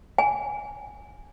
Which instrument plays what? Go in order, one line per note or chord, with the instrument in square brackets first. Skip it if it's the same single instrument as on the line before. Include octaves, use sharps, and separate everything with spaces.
[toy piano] G#5